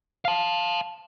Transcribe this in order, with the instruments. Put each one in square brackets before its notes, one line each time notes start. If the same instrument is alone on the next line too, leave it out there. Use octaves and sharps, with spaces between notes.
[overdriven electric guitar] F5 A5